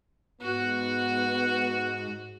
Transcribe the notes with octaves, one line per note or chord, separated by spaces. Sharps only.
G#2 B3 F#4 F#5